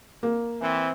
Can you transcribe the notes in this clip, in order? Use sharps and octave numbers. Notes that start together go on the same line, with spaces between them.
A#3
E3 C4